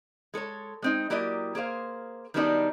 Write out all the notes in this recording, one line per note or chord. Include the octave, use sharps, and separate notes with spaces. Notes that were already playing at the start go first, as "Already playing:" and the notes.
G#3 A4 A#4 C#5
G#3 C4 D#4
F#3 A#3 E4 G4 D5 D#5
A#3 G#4 C5 F5
D#3 F#3 G3 B3 D4 D#4